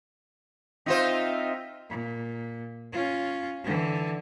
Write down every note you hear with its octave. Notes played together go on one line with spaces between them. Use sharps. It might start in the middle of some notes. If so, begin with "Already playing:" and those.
C4 D#4 F4 C5 D#5 E5
A#2
C#4 F4
D3 E3